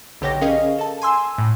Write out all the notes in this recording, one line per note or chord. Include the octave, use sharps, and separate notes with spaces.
B1 D3 G4 C#5 G5 A#6
C#4 G#4 A#4 D#5 F5
A4 A5
G#5 C6 E6
A2